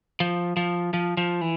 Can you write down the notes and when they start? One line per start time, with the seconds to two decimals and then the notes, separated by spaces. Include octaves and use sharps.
0.20 F3
0.57 F3
0.94 F3
1.17 F3
1.41 E3